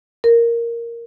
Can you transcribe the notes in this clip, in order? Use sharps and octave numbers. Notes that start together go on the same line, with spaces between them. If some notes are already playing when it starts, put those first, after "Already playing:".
A#4